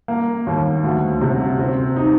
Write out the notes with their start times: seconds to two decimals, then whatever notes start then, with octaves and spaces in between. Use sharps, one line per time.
0.08 A#3
0.47 D#2
0.84 D2
1.21 C3
1.59 C4
1.96 D#4